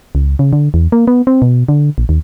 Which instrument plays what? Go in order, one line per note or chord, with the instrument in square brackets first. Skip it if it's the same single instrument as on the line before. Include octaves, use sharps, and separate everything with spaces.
[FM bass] C#2
C#3
D3
E2
A#3
B3
C4
B2
D3
A#1
D#2